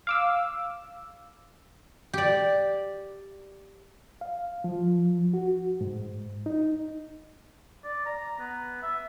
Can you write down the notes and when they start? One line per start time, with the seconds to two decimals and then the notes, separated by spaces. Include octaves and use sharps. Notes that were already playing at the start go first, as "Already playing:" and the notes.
0.07 F5 D6 E6
2.13 G4 D5
4.21 F5
4.64 F3
5.33 F#4
5.81 G#2
6.46 D#4
7.84 D5
8.06 A#5
8.39 B3
8.83 E5